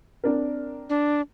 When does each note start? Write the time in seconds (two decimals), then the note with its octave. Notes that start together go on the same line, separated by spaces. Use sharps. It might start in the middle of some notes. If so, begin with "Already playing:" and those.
0.24 C4 D4 A#4
0.89 D4